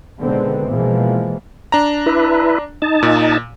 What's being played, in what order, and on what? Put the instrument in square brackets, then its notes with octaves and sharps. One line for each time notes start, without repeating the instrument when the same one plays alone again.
[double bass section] B2 D3 D#3 G#3 B3 C4
B2 E3 F3 G#3 A#3
[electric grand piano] D4 A#5
[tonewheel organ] E4 B4
D#4 A5
[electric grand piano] A#2